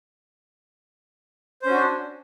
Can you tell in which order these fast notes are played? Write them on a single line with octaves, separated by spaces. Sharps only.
C5 C#4 F#4 D4